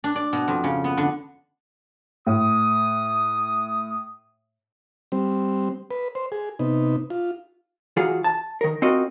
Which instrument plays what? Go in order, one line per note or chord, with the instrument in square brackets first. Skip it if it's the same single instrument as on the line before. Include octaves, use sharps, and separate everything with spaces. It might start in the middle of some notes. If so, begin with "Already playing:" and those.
[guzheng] D4
D5
B2
F2
C#3
B3
D3
[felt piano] A2 [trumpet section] D#6
[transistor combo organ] G3 C4
B4
C5
G#4
C3 B3 D#4
F4
[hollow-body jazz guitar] E3 F4 F#4 G#4
A5
D#3 A#4
C4 F4 F#4 A#4 D#5